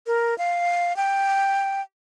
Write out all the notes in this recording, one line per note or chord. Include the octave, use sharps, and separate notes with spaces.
A#4
F5
G5